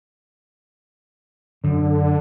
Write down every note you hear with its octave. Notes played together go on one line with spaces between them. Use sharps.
F#2 D3